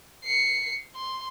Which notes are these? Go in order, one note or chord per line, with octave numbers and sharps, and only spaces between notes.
C7 C#7
C6